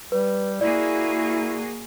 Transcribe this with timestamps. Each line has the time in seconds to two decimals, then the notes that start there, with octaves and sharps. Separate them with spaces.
0.12 G3 B4
0.61 A#3 E4 F#4 G#4 D5